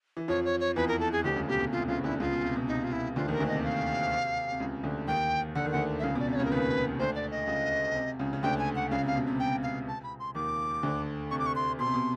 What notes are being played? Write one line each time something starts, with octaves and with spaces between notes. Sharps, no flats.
E3
F2 F3 C#5
C#5
C#5
E2 E3 B4
A#4
A4
G#4
D2 D3 G4
C#2 C#3
B2 G4
B2
C3 F4
C#2 C#3 F4
D2 D3 E4
C#2 C#3 F4
B2
C3
B2
C3 D#4
F4
E4
D2 D3 F4
D#2 D#3 A#4
D2 D3
C3 D#5
F5
C3
C#2 C#3
D2 D3
D#2 D#3 G5
D3 F#5
D#3
D2 D3 F#5
E5
C#2 C#3 F5
B2 D5
C3 D5
C#2 C#3 C#5
A#4
D#2 D#3 B4
D2 D3 C5
D5
D#5
C#2 C#3
C3
C#2 C#3
C#3
D2 D3 G5
G#5
F#5
C#2 C#3 F5
C3 F5
B2
C3
G5
F5
A5
B5
C6
D#2 D#3 D6
D2 D3
C3 C#6
D6
C#6
C6
B2 C6
C3
B2